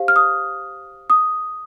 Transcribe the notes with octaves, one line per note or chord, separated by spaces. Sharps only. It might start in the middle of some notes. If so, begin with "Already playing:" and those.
Already playing: G4 C5 F5
F6
D#6
D#6